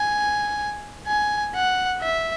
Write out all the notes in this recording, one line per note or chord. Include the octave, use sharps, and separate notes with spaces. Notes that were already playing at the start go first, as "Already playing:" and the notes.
Already playing: G#5
G#5
F#5
E5